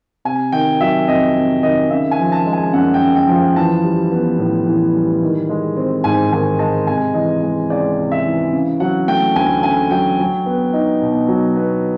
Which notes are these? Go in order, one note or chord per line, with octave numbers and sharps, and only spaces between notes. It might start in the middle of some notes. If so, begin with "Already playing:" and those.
C3 G#5
D#3 G5
F#3 E5
F2 D#5
C3
D#3 D#5
C#3 E5
G#5
F3
A5
G#3
G#5
F#2 F#5
G5
C#3
G5
F3
E3 A5
G3
B3
A2
E3
G3
D#3
G#3
C4
G#2 G#5
D#3 G#5
G#3 A5
C3 G#5
E3 D#5
G#3
C#2 D5
C3
E5
E3
C#3
F#3 F#5
A3 G5
D2 G#5
C#3 G#5
F#3 G5
F#3
B3
D#4
B2
F#3
B3